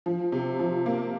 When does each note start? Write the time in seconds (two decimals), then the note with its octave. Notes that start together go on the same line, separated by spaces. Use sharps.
0.06 F3
0.32 C3
0.59 F3
0.86 A#3